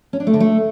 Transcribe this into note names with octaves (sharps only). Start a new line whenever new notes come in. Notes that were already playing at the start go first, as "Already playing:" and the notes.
C#4
D4
A3
D3
A3